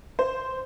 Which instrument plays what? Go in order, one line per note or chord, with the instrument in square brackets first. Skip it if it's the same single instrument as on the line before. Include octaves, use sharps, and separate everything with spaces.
[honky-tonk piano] C5